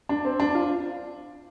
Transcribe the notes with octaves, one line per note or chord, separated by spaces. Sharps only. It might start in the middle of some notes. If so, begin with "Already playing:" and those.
D4
C4
D4
F4